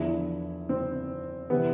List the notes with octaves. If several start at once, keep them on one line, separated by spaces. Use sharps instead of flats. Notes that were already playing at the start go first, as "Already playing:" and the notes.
Already playing: E2 D3 F3 E4
C4
C3 E3 B3